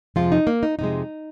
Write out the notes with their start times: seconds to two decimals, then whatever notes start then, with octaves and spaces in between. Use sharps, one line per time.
0.16 F2 C3 F3 G#3 F4
0.32 D#4
0.47 A#3
0.63 D#4
0.79 F2 C3 F3 G#3 D#4